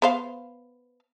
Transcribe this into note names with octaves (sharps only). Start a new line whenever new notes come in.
B3 C5 F5